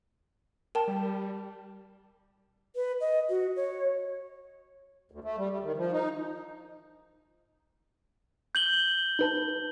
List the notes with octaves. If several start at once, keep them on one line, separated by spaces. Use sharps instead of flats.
A#4 G5 A5
G3
B4
D#5
F#4
C#5
D2
A3
G3
G3
D#3
F3
D#4
G6 F#7 G7
D#4 B4 A5